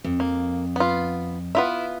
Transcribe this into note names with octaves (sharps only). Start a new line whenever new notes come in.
F2
A#3
B3 F4
B3 E4 F4 E5